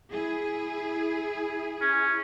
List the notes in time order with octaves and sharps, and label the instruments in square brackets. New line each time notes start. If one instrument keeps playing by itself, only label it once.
[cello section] E4 G#4
[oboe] C#4